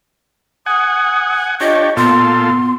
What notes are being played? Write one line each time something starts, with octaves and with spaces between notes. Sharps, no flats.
F#5 G#5 D#6
D4 F4 G4 C#5 D#5
A#2 B3 F4 A4 C6